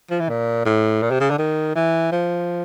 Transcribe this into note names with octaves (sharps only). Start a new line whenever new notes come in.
F3
E3
A#2
A2
A#2
C3
C#3
D3
D#3
E3
F3